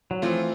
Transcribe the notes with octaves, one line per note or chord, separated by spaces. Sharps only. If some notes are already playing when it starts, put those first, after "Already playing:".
F#3
E3 F3 A3 C4 F4